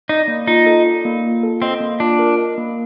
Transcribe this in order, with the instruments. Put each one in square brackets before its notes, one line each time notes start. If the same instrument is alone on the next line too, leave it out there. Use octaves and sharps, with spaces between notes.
[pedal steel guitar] D#4 [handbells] D5
[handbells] A#3
[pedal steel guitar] D#4 [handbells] F4
[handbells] A4
D5
A#3
F4
A4
[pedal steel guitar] C4 [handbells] D#5
[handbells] A#3
[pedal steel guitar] D4 [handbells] F4
[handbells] A#4
D#5
A#3